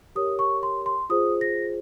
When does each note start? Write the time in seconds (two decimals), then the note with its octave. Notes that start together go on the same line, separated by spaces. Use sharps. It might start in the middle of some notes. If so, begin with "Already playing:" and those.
0.16 G4 A#4 C#5 D#6
0.39 C#6
0.63 C6
0.86 C6
1.10 F4 G#4 C5 D#6
1.41 A#6